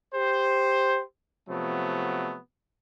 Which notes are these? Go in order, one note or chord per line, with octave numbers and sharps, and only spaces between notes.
G4 C5
C3 F3 F#3 A3 B3